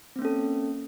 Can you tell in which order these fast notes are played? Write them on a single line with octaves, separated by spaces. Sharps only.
C4 A#3 C#4 A4